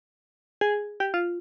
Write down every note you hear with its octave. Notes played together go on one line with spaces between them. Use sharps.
G#4
G4
F4